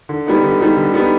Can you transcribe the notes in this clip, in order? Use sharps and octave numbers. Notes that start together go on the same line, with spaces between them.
D3
G3 B3 D#4
D3
G3 B3 D#4
D3
G3 B3 D#4